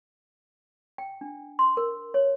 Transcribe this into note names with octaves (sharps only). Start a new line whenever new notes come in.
G5
D4
C6
A#4
C#5